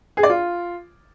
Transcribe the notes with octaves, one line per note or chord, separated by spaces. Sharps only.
G#4
D5
F4